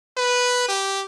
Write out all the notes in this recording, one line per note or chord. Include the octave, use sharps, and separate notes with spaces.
B4
G4